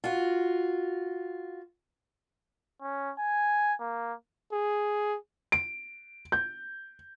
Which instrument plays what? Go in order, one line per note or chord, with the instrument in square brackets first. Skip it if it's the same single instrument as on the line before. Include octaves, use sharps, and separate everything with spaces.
[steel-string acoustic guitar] F4 F#4
[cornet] C#4
G#5
A#3
G#4
[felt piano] D7
G6